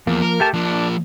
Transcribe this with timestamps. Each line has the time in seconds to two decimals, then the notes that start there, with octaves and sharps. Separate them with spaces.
0.07 E2 F3 A#3
0.22 A#4
0.40 A3 G4 A5
0.54 F3 A#3 D4